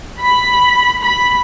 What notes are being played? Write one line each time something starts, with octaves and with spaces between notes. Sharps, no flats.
B5
B5